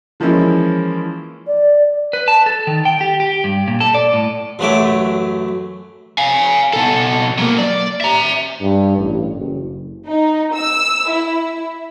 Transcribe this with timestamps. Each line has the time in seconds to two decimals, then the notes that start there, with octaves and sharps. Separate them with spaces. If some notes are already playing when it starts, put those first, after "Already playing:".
0.20 E3 F3 G#3 A#3 C#4 E4
1.46 D5
2.13 B4
2.28 A5
2.46 A4
2.67 D#3
2.85 G5
3.01 G4
3.20 G4
3.44 G2
3.68 A#2
3.80 A4
3.95 D5
4.13 A2
4.59 A1 F#2 F#3 A3 E5 D6
6.18 F5 G#5
6.73 B2 A4
7.39 F#3 A#3
7.58 D5
8.01 E5 A#5
8.61 G2
8.98 A1
9.35 F#1
10.07 D#4
10.53 E6
11.10 E4